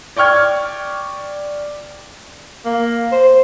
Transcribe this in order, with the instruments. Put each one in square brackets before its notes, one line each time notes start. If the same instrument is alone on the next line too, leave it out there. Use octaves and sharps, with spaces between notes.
[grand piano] D5 G5 C#6 F6 G#6
[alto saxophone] A#3
C5